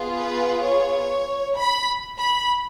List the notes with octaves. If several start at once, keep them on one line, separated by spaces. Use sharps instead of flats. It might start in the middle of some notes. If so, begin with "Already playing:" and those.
Already playing: B3 F4 G#4
B4
C#5
B5
B5